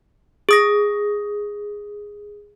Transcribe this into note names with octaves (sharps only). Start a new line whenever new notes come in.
G#4 D#6 A#6